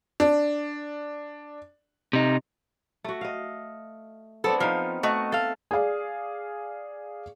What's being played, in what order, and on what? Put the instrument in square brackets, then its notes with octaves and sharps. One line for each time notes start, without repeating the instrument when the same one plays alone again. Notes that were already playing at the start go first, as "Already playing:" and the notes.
[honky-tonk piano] D4
[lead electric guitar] C3 D#4
[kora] A3 F#4
D#5 F5
[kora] B3 C4 D4 [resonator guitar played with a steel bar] A4
[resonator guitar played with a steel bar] F3 [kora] D#4 F5
[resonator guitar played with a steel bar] A3 F#4 D#5
[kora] A3 [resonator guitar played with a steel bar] A4 F5
[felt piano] G#4 D5 F5